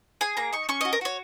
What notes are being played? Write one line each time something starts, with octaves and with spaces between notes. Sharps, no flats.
G#4 G#5
A#3 A#5
D#4 C#6
C#4 C#6
F#4 D#5
A#4
F#4 C#5